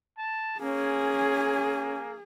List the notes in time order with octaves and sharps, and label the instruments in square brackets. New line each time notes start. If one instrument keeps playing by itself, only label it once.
[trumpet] A5
[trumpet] A#3 [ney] C#4 [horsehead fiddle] G#4 [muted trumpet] G#5